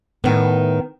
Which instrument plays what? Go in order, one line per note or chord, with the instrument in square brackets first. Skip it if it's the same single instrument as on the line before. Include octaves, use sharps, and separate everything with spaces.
[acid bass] A2 [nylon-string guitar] D#3 B3